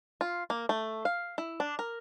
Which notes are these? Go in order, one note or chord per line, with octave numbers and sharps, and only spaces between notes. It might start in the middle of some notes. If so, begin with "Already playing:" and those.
F4
A#3
A3
F5
E4
D4
A#4